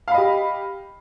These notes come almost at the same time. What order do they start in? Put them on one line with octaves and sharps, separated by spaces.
F5 B5 D#5 G4